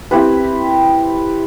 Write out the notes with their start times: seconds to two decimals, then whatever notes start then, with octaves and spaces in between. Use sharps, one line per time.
0.11 C4 E4 G4 B4